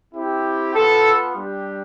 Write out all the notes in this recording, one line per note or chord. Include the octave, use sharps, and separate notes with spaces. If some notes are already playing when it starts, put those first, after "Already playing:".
C4 E4 G4
B3 F4 A4
G3 D4 G4